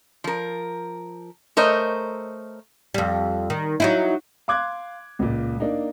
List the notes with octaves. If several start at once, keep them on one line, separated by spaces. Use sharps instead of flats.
F3 A#4
A3 A#4 C5 C#5 D#5
F2 G3
D#3
F#3 D#4 E4
F5 C6 D6 F#6 G#6
C#2 A#2
A#3 D4 D#4